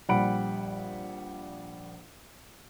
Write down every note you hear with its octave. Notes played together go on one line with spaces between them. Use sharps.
A#1 G3 F#5 B5 D7